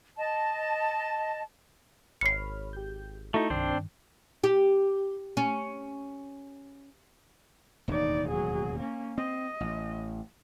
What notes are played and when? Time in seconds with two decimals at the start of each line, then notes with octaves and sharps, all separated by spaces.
0.17 D#5 A5
2.21 G#1 C#5 B5 F6 C7 C#7
2.73 G4 G6
3.34 A3 D#4 E4 F#4 A4
3.50 C2 G2 D#3 C4 D4 C5
4.44 G4
5.37 C#4
7.88 E1 D#2 A2 D#4 D5
8.29 F#3 G#4
8.79 A#3 C#4
9.18 C4 D#5
9.60 A1